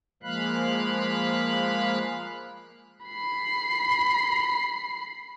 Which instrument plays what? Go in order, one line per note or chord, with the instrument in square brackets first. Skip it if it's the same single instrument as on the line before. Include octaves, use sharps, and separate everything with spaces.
[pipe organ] F3 G#3 A#3 F5 B5 F#6
[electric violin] B5 C7